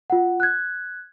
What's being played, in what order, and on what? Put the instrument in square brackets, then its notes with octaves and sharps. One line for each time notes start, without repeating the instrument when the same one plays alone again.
[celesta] F4 F#5
F#6 G#6